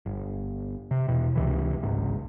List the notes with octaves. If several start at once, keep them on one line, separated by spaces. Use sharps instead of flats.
G1
C3
E2 B2
C#2 C3 E3
G#1 C#2 G#2